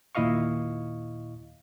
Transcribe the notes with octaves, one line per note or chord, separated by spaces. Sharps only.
D#2 A#2 E4 D#5 F5 C#6